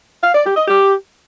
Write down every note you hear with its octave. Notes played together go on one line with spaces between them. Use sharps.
F5
D5
G4
D#5
G4